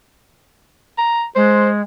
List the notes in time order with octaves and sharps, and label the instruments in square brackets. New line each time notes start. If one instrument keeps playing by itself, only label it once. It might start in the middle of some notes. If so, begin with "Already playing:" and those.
[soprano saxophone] A#5
[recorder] G#3 [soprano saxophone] C5